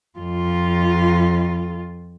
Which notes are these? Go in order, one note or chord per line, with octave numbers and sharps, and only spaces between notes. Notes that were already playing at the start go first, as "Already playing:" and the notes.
F2 F4